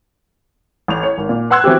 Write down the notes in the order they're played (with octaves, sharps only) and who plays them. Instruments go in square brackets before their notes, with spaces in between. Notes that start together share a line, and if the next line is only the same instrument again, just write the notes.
[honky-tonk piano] A1 F7
C#5
G#1
A#2
B4 F#5 C6 E6 F#6 G#6
E3 B3 C4 F#4 G4